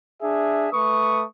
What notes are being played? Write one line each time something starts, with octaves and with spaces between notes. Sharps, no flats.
D4 G#4 E5
A3 B4 C#6 D#6